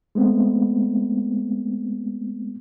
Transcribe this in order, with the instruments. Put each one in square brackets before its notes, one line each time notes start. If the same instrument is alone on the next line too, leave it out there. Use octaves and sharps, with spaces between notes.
[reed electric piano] G#3 A3 B3 C4